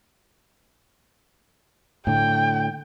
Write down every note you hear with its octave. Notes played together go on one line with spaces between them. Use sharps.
A2 D3 G5